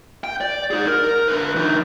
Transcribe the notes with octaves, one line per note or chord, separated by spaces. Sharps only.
G5
D5
D#4 G#4
A#4
D3 B4
E3 D#4